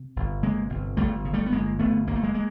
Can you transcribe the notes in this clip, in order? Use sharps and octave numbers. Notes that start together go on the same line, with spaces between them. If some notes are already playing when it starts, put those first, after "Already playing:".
Already playing: C3
G1
C3 G#3 A#3
G1
G1 G3 A3
C#3
G3 A3
B3
G1 G#3 A#3
G1 A3 B3
G1 A#3
A3
G#3 A#3
G#3 A#3